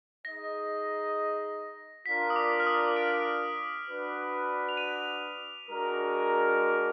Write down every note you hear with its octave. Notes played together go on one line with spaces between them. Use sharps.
D#4 G#4 D#5 A#6
D4 F4 A#4 D5 B6
D#6
D6
F6
D#6
D7
D4 F#4 B4
F7
D#7
G#3 D4 F#4 A#4